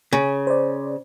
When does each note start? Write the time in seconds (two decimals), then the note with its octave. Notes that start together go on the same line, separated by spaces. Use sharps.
0.13 C#3
0.47 C5 D5